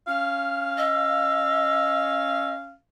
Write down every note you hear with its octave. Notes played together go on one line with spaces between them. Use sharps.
C#4 F5 F6
D#5 E6